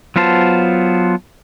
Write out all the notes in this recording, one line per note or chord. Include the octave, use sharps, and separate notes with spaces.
F#3 B3 F4 C5 A5